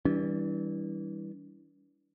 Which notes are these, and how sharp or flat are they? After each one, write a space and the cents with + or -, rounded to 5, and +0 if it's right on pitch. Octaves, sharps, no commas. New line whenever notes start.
E3 -30 G3 +0 D4 -45